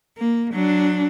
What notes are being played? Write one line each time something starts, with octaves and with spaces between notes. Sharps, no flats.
A#3
F#3 D4